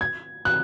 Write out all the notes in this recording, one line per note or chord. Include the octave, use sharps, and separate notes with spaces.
G#6
F#6